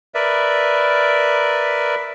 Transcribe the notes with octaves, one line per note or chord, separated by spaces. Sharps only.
A#4 B4 D5 E5